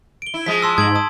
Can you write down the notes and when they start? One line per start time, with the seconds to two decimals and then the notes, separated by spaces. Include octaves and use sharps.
0.22 D7 G7
0.34 E4
0.46 F3 G#3 B6
0.62 A5 C6 E6
0.78 G#2 G#6 D7 F#7
0.95 A5 D#6